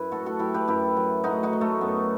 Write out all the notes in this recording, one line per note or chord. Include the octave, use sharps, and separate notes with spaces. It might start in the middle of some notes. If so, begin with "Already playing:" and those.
Already playing: F#2 F#3 E4 B4
A2 F#4 A4
F#4 A4
F#3 E4 G4
G4 B4
F#2 E4 G4
F#3
A2 D#4 F#4
D#4 F#4
F#3
A3
F#2 B3